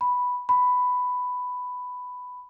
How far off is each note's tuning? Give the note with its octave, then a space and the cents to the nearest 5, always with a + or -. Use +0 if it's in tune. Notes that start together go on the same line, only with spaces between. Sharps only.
B5 +0
B5 +10